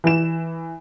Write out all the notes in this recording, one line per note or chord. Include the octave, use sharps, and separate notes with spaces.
E3 E7